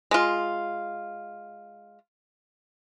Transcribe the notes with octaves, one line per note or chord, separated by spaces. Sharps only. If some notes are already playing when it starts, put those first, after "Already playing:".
G#3 F4